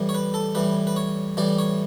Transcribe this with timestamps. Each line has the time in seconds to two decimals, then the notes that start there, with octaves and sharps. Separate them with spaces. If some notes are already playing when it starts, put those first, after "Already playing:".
Already playing: A2 E3 G3
0.09 C#5
0.15 B4
0.34 A4
0.55 A2 E3 G3 B4
0.87 B4
0.96 C#5
1.37 A2 E3 G3 D5
1.59 C#5